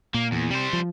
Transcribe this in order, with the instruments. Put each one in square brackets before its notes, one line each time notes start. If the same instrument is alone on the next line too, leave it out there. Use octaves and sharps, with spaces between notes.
[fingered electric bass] A#2 [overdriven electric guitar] A#3
[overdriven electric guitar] E2
[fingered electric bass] C3 [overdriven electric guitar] G3 C5
[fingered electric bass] F3